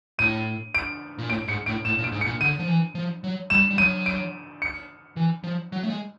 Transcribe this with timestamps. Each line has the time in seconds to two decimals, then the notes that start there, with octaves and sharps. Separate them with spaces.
0.19 A2 D#7
0.75 D7
1.18 A#2
1.30 A2 D7
1.48 G#2 C#7
1.66 A2 D7
1.85 A2 E7
1.98 A#2
2.04 D7
2.12 G#2
2.21 A#2 C#7
2.41 D3 D#7
2.59 F3
2.68 E3
2.95 F3
3.24 F#3
3.50 G3 E7
3.70 G3
3.78 F#3 D#7
4.06 D7
4.62 C#7
5.16 E3
5.44 F3
5.72 F#3
5.83 A3
5.90 G#3